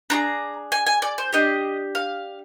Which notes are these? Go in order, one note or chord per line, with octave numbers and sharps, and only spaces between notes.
D4 F4 G#4 A#5
G#5
G#5
D5
C5
D4 G4 D#5
F5